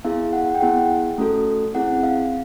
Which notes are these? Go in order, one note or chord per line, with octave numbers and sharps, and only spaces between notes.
B3 E4 G#4 F5
F#5
G5
B3 E4 G#4 F#5
A3 C#4 F#4 A4
C4 E4 G#4 F#5
F5